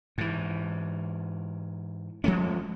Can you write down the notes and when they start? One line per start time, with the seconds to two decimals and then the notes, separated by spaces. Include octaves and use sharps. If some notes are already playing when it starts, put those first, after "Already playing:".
0.18 G#2 E3
2.24 F3 G#3 A3 C#4